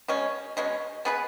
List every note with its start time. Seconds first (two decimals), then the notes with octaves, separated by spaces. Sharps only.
0.08 B2 G#3 C#4
0.57 B2 G#3 C#4
1.05 B3 G#4 B4